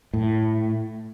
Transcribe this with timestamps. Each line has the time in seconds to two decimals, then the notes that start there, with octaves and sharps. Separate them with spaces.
0.13 A2